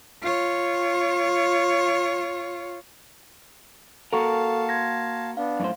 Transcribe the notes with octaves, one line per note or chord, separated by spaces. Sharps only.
F4 C#5
A#3 F#4 A4 A#4 F5 A5 C#6
C6 G#6 A#6
B3 D4 F5
F#2 A2 C5